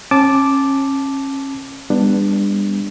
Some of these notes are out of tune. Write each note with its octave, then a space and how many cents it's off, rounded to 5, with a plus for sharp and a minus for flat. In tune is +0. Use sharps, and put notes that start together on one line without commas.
C#4 -30 A5 -15 D6 +0
G3 +40 B3 +0 D4 +10